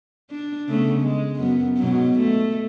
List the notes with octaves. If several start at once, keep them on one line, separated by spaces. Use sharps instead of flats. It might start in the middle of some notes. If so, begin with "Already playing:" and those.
D4
C#3 A3 B3
G#3
F#2 B3
G#2 B2 F#3
A3